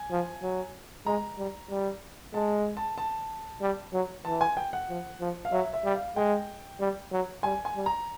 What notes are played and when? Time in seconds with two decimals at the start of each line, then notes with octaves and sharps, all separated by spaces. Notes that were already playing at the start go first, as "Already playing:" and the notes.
Already playing: G#5
0.11 F3
0.42 F#3
1.06 G#3 A#5
1.38 G3
1.70 G3
2.33 G#3 A5
2.77 A5
2.98 A5
3.62 G3
3.93 F#3
4.25 E3 A5
4.41 G#5
4.57 G5
4.73 F#5
4.89 F3
5.20 F3
5.45 F5
5.52 F#3 E5
5.73 E5
5.84 G3
5.95 F5
6.16 G#3 G5
6.80 G3
7.12 F#3
7.43 G3 G#5
7.65 G#5
7.76 G3
7.86 A#5